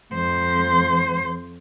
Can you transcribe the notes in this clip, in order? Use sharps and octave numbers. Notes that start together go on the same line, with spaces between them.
F2 C5